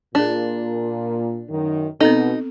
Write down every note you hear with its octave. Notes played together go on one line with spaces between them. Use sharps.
A#2 D4 G#4 D5
F#2 D#3
B2 B3 C4 D#4 A4